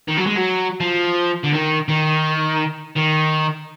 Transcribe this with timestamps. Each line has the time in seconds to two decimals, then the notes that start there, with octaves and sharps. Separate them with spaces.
0.08 D#3
0.17 F#3
0.26 G#3
0.36 F#3
0.80 F3
1.44 D3
1.53 D#3
1.88 D#3
2.96 D#3